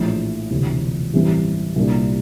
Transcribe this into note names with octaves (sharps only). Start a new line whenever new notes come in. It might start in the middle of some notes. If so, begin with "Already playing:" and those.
Already playing: A#1 A2 E3
E1 D2 C3 E3
A1 G2 E3 G3 C4
C2 A#2 G3 A#3 D4